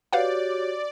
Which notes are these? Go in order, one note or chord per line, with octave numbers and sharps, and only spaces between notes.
F#4 G4 B4 C#5 D5 F5 F#5